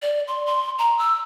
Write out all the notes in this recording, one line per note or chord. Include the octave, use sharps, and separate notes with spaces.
D5
C6
C6
A#5
E6